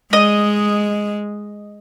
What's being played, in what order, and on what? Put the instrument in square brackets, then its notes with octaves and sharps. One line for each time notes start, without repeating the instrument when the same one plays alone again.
[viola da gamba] G#3 [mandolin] D#5